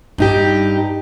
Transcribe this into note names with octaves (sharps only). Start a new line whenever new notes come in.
G2 D#4 G4